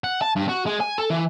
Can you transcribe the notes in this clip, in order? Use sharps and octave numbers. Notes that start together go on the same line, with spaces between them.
F#5
A5
G2
F#4
G#3
G#5
A4
E3